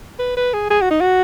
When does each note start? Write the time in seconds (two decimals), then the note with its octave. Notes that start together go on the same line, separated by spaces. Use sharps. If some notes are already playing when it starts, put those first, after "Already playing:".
0.19 B4
0.37 B4
0.53 G#4
0.71 G#4
0.81 F#4
0.91 D#4
1.01 F#4